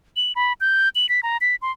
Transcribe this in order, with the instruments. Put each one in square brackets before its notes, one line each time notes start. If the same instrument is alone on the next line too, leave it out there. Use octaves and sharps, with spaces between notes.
[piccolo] F#7
B5
G6
F#7
B6
A#5
B6
C6